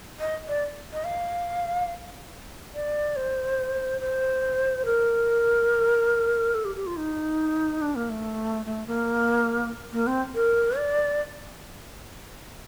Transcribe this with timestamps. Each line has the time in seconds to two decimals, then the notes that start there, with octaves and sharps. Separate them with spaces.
0.20 D#5
0.48 D5
0.93 D#5
1.05 F5
2.74 D5
3.16 C5
4.01 C5
4.86 A#4
6.54 A4
6.65 G4
6.75 G4
6.87 F4
6.97 D#4
7.82 D4
7.95 A#3
8.10 A3
8.66 A3
8.87 A#3
9.93 A#3
10.07 C4
10.35 A#4
10.77 D5